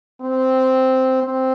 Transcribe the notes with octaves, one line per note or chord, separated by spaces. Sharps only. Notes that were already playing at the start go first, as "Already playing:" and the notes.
C4
C4